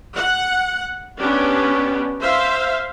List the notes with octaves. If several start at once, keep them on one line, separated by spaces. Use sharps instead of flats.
F#5
B3 C#4 D4 G4
C5 E5 F5